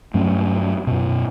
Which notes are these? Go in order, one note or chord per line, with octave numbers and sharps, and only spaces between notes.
G2 F#3 A3 C#4
F#2 B2